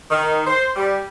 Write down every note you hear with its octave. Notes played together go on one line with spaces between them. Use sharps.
D#3
C5
G3